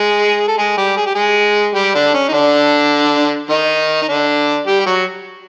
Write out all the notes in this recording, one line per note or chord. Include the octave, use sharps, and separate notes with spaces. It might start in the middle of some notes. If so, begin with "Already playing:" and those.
Already playing: G#3 G#4
A4
G#3 G#4
G3 G4
G#4
G4
G#3 G#4
G3 G4
D3 D4
C#4
D#4
D3 D4
D#3 D#4
D#4
D3 D4
G3 G4
G4
F#3 F#4